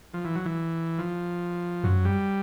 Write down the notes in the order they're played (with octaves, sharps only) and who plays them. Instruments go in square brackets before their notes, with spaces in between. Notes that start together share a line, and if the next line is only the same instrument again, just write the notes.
[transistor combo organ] F3
E3
F#3
E3
F3
[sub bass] F#2 [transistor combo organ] F#3
[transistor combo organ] G3